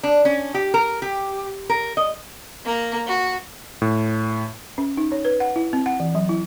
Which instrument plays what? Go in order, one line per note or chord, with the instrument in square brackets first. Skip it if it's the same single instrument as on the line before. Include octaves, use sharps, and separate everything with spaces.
[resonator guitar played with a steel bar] D4
C#4
G4
A#4
G4
A#4
D#5
[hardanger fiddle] A#3 A#5
F#4
[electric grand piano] A2
[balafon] C#4
D#4
C#5
B4
F#5
E4
C4
F#5
E3
F#3
E4